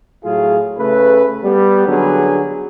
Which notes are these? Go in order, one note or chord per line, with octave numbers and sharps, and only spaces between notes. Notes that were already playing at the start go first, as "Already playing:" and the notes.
A2 F#3 F4 G#4
C#3 A3 B4
G3 B3
D3 F#3 B3 C#4 G#4